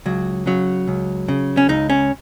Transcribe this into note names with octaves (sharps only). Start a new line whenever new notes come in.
C#2 F#3
C#3 F#3
C#2
C#3
C#4
C#2 D#4
C#4